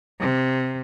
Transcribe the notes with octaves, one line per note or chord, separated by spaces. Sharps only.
C3